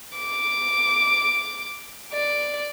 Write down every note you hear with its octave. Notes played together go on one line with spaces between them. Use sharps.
D6
D5